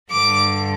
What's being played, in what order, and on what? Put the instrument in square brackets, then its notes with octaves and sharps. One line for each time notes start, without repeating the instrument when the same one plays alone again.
[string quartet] G2 D3 D6